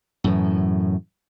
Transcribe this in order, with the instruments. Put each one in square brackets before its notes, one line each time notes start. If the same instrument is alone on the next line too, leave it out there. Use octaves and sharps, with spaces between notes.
[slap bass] F#2 A2 E3